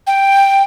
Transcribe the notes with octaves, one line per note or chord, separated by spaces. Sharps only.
G5